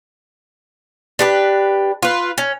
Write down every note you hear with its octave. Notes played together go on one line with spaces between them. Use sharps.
D4 G4 B4
F4 B4
C#4